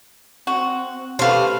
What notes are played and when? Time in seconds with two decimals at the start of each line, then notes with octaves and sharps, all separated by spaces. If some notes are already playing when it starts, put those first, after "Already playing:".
0.47 C4 F#4
1.19 C#3 A3 G4 B4 C5 F5